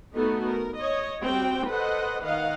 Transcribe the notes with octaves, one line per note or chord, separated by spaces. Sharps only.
A3 B3 D#4 F#4 A4
A#4
C#5 D#5
G3 C4 F#4 G5
A4 B4 C5 D#5 F#5
D#3 D#5 F5 F#5